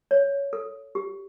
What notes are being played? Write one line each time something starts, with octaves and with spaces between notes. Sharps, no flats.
C#5
A4
G4